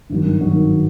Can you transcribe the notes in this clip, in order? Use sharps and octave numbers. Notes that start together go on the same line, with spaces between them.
G#1 G2 D#3 F#3
G#1 G2 D#3 F#3